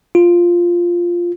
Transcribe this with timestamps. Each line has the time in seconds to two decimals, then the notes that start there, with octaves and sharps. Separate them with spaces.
0.15 F4